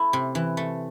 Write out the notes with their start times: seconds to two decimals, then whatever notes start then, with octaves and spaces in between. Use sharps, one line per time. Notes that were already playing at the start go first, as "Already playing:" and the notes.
Already playing: A3 E4
0.13 C3
0.35 E3
0.57 A3